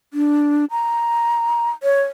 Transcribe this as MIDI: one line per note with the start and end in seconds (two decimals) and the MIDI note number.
0.14 0.65 62
0.71 1.70 82
1.83 2.02 73